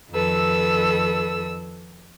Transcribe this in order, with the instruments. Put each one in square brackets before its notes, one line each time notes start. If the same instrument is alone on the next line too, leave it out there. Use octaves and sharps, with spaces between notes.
[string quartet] F2 D#3 A4 B4 E6